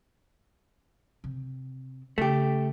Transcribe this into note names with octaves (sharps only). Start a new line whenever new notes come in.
C3
C#3 A3 G4